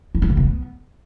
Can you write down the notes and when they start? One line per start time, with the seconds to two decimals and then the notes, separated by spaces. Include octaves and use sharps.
0.15 D4
0.22 C#4
0.29 C#3
0.37 A3
0.44 B3